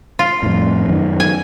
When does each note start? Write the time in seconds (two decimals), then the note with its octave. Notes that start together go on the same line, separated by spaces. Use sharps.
0.19 F4
0.43 F2 A2
0.88 F#2 D#3
1.20 G#5